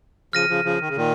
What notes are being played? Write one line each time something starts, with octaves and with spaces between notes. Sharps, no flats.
C#3 F3 F6 A#6 D#7
C#3 F3
C#3 F3
D#3
C#3
A#2 D#3